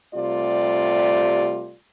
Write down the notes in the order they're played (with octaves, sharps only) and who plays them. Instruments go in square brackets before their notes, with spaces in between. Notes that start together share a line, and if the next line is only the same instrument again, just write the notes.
[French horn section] C3 G3 A3 F4 D5